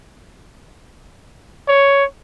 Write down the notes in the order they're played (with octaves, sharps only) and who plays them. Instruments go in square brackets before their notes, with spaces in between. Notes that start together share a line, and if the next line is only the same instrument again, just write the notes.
[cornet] C#5